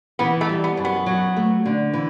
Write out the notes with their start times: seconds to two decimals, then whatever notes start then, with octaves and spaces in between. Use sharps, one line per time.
0.19 E3 B3
0.41 A3
0.49 G3
0.64 B3
0.77 F#2
0.85 B3
1.06 F#3
1.36 A3
1.66 D3
1.93 E3